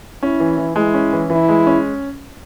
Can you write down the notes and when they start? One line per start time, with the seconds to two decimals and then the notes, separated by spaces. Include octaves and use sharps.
0.23 C#4 E4
0.40 E3
0.58 E3
0.76 G#3 E4
0.94 C#4
1.13 E3
1.30 E3 E4
1.49 G#3
1.67 C#4